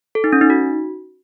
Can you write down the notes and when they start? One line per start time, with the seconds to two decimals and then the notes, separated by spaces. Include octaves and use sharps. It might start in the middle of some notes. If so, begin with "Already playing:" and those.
0.15 A4
0.24 D#4
0.33 C#4
0.41 D#4
0.50 F#4